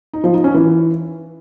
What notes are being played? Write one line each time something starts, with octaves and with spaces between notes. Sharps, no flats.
D#4
F3
D#4
C#4
E3